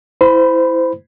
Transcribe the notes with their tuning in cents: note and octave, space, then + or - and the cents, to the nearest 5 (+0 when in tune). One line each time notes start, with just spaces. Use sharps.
E4 +0 C5 -25 B5 +0